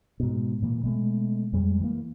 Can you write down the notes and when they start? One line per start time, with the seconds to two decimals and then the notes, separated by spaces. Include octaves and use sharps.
0.20 G#2 B2
0.62 A#2 E3 A#3
0.84 B2 G#3 A3
1.53 F2 G3 G#3
1.80 E3 A#3